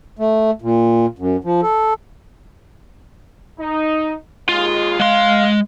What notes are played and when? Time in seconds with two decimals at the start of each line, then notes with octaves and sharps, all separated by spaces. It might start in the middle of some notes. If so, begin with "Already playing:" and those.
0.19 A3
0.62 A#2
1.19 F#2
1.44 F3
1.63 A4
3.60 D#4
4.49 D#2 G#3 F4
5.00 G#3 F5 C6